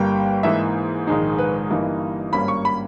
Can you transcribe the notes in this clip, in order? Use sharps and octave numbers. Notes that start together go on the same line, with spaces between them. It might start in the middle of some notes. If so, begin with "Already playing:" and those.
Already playing: G1 G2 G3 A#3 G5
G#2 E3 A#3 D#4 E5
A#1 G#2 D#3 G#3 D#4
B4
G1 G2 E3 A#3 D#4
G#1 G2 G3 A#3 C#4 B5
C#6
B5